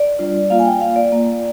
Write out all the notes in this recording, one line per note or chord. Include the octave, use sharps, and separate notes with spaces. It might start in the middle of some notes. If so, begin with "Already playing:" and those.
Already playing: D5
G3 D4 F4
G3 A#3 F4 F5
G#5
G5
A#3 F4 F5
D5
A#3 F4